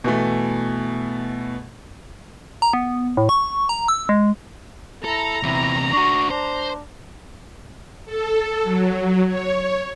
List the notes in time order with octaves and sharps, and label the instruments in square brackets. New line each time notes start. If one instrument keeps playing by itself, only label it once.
[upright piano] B2 E3 A3
[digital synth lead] A#5
B3
A2
C#6
A#5
E6
G#3
[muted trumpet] E4 [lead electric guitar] A4 [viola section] A#5
[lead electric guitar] E2 C3 [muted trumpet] E4
[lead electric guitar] D4 F#4 [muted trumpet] C#6
[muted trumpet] D4 [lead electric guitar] C5
[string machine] A4
F#3
C#5